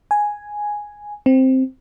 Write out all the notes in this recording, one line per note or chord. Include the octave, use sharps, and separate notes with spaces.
G#5
C4